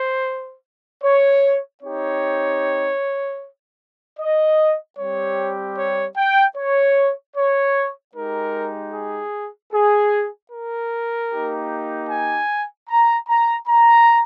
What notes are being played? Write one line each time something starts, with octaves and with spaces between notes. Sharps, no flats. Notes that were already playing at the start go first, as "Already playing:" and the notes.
Already playing: C5
C#5
C4 D#4 G4 C#5
D#5
G3 C4 G4 C#5
C#5
G5
C#5
C#5
G#3 D#4 G4 A#4
G#4
G#4
A#4
A#3 D#4 G4
G#5
A#5
A#5
A#5